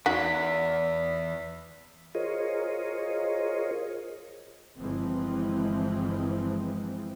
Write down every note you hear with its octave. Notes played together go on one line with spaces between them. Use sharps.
E2 D#4 F#4 B6
F4 G#4 A#4 C5 C#5 D#5
G1 E3 F3 G#3 C4